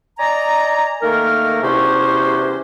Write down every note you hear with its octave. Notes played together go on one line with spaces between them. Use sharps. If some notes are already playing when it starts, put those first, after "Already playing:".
D5 D#5 G#5 A#5
D#3 A3 A#3 A#4
E2 G2 C3 C#4 F#4 C5